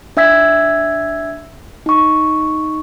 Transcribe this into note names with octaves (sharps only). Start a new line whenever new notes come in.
D4 E5 E6 G#6 B6
D#4 C#6